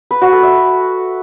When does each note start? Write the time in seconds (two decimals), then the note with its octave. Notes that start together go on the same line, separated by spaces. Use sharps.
0.11 B4
0.21 F#4
0.32 A4
0.43 E5